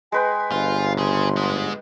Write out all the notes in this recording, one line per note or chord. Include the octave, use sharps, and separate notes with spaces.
G#3 B4 G5 G#5
G1 F4
C#3 G#4 C6
G#2 G#3